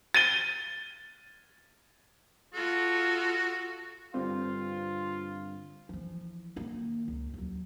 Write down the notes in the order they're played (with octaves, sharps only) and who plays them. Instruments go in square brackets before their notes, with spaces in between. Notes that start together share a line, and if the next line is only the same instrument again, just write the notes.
[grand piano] A6 D#7 G7
[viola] F4 A4 [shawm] F#4
[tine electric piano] G2 D3 G3 [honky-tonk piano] C4 [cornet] F4
[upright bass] E3 F3
D#3 A#3
C#2
D#2 F#3